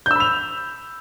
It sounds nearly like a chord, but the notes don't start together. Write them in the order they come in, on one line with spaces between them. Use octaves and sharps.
G6 E6 B5 F7